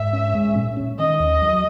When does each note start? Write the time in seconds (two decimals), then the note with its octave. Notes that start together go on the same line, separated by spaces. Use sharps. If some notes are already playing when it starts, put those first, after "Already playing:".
Already playing: G#2 E5
0.13 C#4
0.35 G#3
0.56 A#2
0.77 C#4
0.98 D#3 D#5
1.20 D#2
1.42 F#3